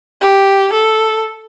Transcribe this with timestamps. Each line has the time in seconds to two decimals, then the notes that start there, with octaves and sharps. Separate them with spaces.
0.21 G4
0.73 A4